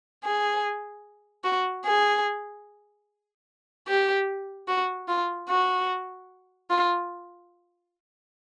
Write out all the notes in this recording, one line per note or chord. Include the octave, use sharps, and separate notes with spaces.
G#4
F#4
G#4
G4
F#4
F4
F#4
F4